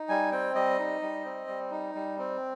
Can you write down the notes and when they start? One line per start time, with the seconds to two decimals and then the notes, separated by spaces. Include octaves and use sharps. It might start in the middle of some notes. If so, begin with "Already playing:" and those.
Already playing: D#4
0.09 G3 G#5
0.32 C4 G5
0.55 G3 D#5
0.79 D#4
1.01 G3
1.25 C4
1.48 G3
1.71 D#4
1.95 G3
2.18 C4